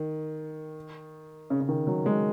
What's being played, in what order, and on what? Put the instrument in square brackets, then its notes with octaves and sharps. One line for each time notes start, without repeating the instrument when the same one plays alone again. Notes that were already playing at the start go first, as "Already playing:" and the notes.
Already playing: [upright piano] D#3
C#3
C#3
D#3
F#3
G#3